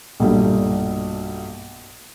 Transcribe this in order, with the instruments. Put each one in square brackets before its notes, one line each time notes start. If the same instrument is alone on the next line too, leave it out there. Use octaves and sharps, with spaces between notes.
[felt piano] B1 G2 A#2 G3 A3